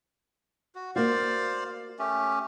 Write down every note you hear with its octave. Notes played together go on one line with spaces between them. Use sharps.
F#4
A#3 F#4 C5 D5 F5
A3 C#4 G4